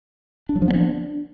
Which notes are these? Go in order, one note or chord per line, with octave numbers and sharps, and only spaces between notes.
D4
F#3
F3
B3
D4